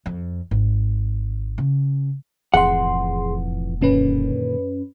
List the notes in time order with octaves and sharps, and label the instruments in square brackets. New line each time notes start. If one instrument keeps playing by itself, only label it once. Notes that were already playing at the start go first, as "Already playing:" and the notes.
[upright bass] F2
G#1
C#3
[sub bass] E1 [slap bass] F2 A2 E3 [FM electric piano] G#4 C6 [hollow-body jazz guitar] F#5
[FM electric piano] F#2 C#4 B4 [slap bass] A#2 D3 D#3